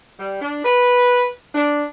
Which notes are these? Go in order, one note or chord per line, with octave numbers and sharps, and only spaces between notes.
G3
D4
B4
D4